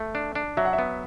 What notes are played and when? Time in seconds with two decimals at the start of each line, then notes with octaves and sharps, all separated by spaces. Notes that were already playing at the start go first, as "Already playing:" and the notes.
Already playing: A3
0.15 D4
0.35 D4
0.57 F#3 E5
0.65 F#5
0.73 E5
0.78 B3